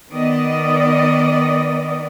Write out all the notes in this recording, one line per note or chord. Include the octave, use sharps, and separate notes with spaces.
D#3 B3 D5 D#5